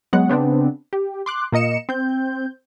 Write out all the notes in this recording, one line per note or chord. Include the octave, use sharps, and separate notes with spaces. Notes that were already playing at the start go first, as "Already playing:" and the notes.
F#3 G#3 B3 F#5
C#3 B3 C4 D4
G4
C6 D6 F#6
A#2 A#3 D#5 C#7 E7
C4 G6